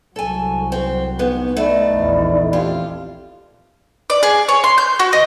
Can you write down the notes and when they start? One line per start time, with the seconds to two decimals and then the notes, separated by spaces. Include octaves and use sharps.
0.16 C2 F#3 A4 G#5
0.72 C4
1.19 G#2 B3
1.57 A3 D#4 D5 B5
1.91 A#1 E2
2.53 F2 F4 G4
4.10 D5
4.23 G#4
4.48 C#5
4.64 C6
4.78 G6
4.99 F#4
5.13 D#5